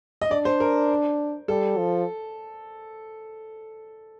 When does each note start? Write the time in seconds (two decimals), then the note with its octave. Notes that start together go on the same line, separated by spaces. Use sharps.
0.22 D#5
0.31 D4 D5
0.45 C5
0.60 A#4
1.48 G3 A4
1.78 F3